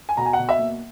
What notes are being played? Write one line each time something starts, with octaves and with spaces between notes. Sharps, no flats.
G#5
B2 A#5
G#5
F#5
B2
E5
A#3